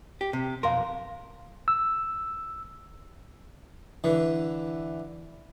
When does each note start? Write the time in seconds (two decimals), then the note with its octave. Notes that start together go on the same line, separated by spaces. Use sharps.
0.21 G4
0.33 C3
0.63 B1 F2 A#4 F5 C6
1.68 E6
4.04 D3 E3